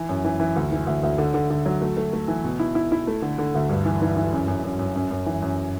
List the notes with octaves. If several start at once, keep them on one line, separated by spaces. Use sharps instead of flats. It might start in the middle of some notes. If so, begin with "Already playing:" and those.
Already playing: E3
F#2
E3
E3
D2
E3
D2
D2
D3
D3
D3
F#3
A3
A3
A3
E3
B2
E4
E4
E4
A3
D3
D3
D2
G2
E3
E3
E3
F#2
F#2
F#2
F#2
F#2
F#2
E3
F#2